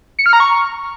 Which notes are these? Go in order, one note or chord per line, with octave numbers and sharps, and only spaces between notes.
C#7
F6
A#5
C#6